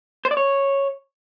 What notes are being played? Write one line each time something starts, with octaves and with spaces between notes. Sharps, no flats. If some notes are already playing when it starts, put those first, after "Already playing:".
C5
D5
C#5